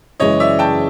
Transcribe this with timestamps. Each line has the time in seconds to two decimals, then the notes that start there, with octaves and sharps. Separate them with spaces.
0.20 F#2 C#3 E3 G#3 C#5 D#5
0.40 D5 E5
0.59 G5 A5